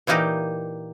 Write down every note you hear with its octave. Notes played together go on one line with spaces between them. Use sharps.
A#2 E3 A#3 D#4 G4